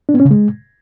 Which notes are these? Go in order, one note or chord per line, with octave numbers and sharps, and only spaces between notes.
D4
B3
C#4
C#3
G#3